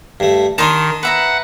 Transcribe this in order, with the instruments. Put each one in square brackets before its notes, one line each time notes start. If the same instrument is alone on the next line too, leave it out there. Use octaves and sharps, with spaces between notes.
[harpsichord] G2 A3
[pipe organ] D#3 [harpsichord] D4 D#5 A5 [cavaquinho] D#4 A#5 C6
[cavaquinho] B4 E5 A#5 [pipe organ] F#5 F#6